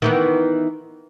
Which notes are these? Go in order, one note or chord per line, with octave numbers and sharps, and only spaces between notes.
D#3 E3 B3